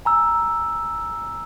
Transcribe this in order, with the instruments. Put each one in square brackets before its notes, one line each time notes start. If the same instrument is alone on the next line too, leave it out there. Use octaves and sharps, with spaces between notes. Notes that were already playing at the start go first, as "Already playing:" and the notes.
[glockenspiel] G#5 A#5 E6